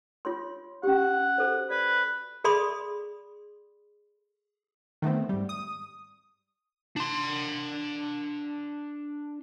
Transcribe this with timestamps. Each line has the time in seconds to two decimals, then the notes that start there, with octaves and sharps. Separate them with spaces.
0.25 F4 C#5 C6
0.83 C#4 G4 F#5
1.38 F#4 A4 C5
1.70 B4 D5
2.44 G#4 A4 D5 B5 C6 D#6
5.02 D#3 A3 B3 C4
5.29 G#2 G3
5.49 D#6
6.96 D4 C6